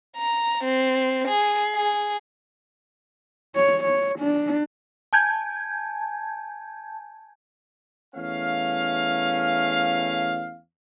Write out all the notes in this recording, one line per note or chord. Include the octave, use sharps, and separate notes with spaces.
A#5
C4
G#4
G#4
C#5
C#5
D4
G#5 A5 G6 G#6
E2 A3 C#4 F5